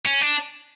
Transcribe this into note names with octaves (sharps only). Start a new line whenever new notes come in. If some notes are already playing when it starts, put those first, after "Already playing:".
C#4
D4